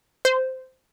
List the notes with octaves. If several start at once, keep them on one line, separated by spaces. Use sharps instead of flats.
C5